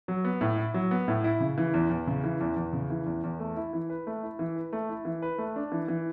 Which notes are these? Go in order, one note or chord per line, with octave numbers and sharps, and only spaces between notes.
F#3
B3
A2
E4
F#3
B3
A2
E4
C#3
E3
E2
E2
C#3
E3
E2
E2
C#3
E3
E2
E2
A3
E4
E3
B4
A3
E4
E3
B4
A3
E4
E3
B4
A3
D4
E3
E3